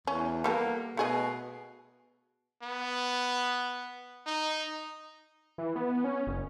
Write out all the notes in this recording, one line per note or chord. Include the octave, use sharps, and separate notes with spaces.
E2 C#4
G3 A#3 B3 A4
B2 A3 G#4 D#5
B3
D#4
E3
B3
C#4
F#1